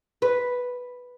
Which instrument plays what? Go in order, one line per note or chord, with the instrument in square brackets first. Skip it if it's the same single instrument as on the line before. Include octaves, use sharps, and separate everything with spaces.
[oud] B4